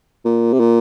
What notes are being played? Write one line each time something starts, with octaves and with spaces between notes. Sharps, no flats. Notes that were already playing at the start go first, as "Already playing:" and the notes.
A#2
C3
A#2